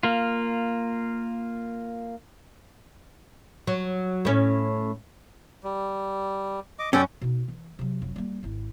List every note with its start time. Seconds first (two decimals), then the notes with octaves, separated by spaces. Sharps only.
0.03 A#3 F4
3.67 F#3
4.25 A2 C#4
5.64 G3
6.79 D#5 D6
6.93 F#2 C#4 A4 D5 G5
7.22 B2 D#4
7.48 E3
7.79 C3 F#3
8.02 F1 F#3
8.16 G3 A#3
8.43 G#1 E4